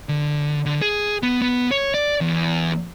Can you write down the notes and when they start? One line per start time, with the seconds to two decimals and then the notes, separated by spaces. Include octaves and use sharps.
0.09 D3
0.66 D3
0.82 G#4
1.23 B3
1.41 B3
1.71 C#5
1.94 D5
2.21 E2